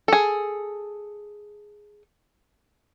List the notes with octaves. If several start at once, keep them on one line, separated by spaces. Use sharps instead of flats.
G#4 A4